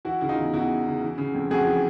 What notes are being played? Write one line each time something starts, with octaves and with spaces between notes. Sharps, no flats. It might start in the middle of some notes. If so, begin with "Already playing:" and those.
E3 E4 F#4
C#3 E4
D#4 F4
E2
E2 E4 F#4
E3
C#3
E3
C#3
F2
F2 F#4 G#4
E3